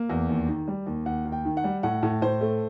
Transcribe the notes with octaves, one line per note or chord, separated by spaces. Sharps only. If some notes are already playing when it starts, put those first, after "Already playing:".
Already playing: A#3
E2
D#2
D#3
G3
D#2
D#2 F#5
D#2
G5
D#3
F#5
G3
A2 F#5
A2
A2 C5
A3